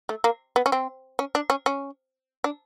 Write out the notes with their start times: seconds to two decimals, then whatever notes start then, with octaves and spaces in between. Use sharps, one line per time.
0.09 A3
0.24 A#3
0.56 B3
0.66 C#4
0.72 C4
1.19 C#4
1.35 D4
1.50 C#4
1.66 C#4
2.44 D4